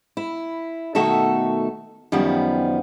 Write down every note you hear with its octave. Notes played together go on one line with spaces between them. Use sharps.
E4
B2 D#3 A3 F#4 A4 E5
F#2 D#3 F3 G3 B3